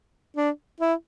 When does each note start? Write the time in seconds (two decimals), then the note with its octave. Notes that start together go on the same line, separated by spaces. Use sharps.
0.37 D4
0.80 E4